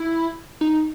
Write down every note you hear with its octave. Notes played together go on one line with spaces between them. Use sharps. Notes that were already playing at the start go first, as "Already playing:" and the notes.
Already playing: E4
D#4